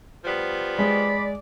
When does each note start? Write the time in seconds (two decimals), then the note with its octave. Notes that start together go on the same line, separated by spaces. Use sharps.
0.24 F3 G3 B3
0.79 G#3 D5 B5